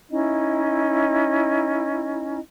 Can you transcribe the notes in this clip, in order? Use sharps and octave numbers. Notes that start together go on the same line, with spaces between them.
C#4 D#4 E4 D#5